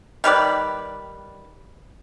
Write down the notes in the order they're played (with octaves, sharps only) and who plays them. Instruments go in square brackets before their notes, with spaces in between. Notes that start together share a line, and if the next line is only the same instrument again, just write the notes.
[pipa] D#3 G3 B4 D5